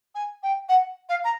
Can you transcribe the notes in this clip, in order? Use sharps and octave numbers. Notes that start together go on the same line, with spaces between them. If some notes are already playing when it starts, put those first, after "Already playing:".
G#5
G5
F#5
F5
A#5